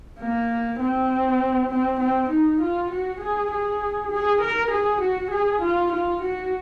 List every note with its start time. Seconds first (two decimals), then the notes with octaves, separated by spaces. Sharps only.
0.20 A#3
0.80 C4
1.70 C4
2.00 C4
2.30 D#4
2.61 F4
2.91 F#4
3.20 G#4
3.51 G#4
4.12 G#4
4.41 A#4
4.71 G#4
5.01 F#4
5.31 G#4
5.61 F4
5.92 F4
6.22 F#4